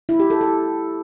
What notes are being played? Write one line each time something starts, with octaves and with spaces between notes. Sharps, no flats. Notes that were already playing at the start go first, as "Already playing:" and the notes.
E4
G4
A4
A4